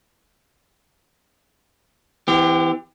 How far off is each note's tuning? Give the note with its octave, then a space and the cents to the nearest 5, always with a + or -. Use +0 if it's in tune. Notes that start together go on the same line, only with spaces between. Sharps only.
E3 +0 C4 -40 G4 +25